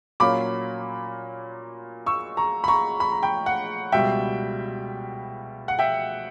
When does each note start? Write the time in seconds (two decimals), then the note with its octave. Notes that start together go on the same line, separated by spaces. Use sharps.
0.20 A#2 F#3 A#3 C#4 B5 D6
2.06 C#6 E6
2.37 A#5 C#6
2.64 B5
2.68 A#5 C#6
3.00 B5
3.12 A#5
3.23 G5 B5
3.46 F#5
3.92 C#2 B2 G3 E5 G5
5.68 F#5
5.79 E5 G5